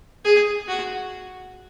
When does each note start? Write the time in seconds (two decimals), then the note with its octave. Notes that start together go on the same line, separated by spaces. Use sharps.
0.24 G#4
0.68 F#4